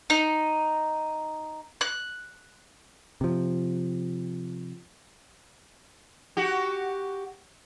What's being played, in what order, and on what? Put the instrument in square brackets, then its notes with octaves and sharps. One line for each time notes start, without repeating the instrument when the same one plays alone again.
[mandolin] D#4
F#6
[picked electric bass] C3 F3
[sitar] F#4 G4